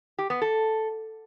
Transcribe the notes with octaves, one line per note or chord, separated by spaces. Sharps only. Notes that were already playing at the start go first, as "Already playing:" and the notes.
G4
B3
A4